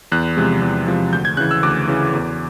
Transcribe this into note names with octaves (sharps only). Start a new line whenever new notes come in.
E2 F#6
C3 F3 G#3
E2
C3 F3 G#3
D2 G6
G#6
C#3 E3 F#6
E6
D2 D6
C#3 E3
E2